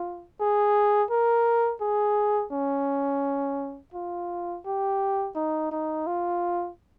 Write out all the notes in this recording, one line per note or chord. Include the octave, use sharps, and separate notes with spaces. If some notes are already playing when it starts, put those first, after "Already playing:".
Already playing: F4
G#4
A#4
G#4
C#4
F4
G4
D#4
D#4
F4